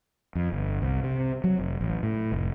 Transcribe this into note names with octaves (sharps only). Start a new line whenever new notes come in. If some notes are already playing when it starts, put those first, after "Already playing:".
F2
G1
C2
C3
F#3
F1
A1
A2
F1